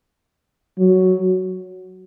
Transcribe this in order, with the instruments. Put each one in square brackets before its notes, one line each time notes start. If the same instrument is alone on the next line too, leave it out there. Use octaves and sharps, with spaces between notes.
[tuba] F#3